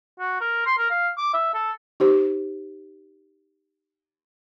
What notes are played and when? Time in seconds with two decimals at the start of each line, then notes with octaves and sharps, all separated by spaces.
0.20 F#4
0.41 A#4
0.66 C6
0.78 A#4
0.90 F5
1.17 D6
1.33 E5
1.54 A4
2.00 D#4 G4 C5